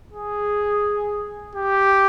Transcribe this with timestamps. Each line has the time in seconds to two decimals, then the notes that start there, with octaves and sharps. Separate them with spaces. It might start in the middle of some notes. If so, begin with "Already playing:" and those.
0.12 G#4
1.55 G4